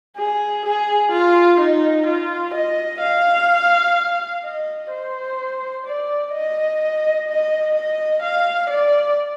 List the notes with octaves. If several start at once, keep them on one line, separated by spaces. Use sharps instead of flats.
G#4
G#4
F4
D#4
F4
D#5
F5
D#5
C5
D5
D#5
D#5
D#5
F5
D5